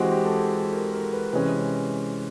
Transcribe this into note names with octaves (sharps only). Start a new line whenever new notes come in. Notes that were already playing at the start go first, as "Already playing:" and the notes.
Already playing: E3 G#3 C4 F#4 G4
G4
A4
G#4
A4
A#4
A#4
B4
C3 E3 G#3 C#4 B4